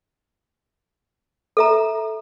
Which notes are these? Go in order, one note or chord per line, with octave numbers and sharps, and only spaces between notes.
A4 E5 A#5